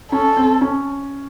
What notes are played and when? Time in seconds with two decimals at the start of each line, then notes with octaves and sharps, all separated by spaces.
0.12 C#4 A4
0.37 C4
0.61 C#4